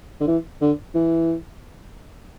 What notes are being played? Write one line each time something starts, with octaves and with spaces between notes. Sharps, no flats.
D3
E3
D3
E3